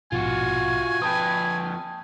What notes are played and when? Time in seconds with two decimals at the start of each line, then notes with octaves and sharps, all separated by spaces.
0.12 A#1 G#2 B2 F4 F#4 G#5
1.02 F2 B4 G5 A5 D#6